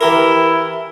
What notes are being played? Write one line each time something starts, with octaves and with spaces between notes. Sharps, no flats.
E3 E4 G4 A#4